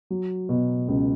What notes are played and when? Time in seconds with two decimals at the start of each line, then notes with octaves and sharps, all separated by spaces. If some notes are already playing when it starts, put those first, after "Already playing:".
0.10 F#3
0.49 B2
0.88 C#2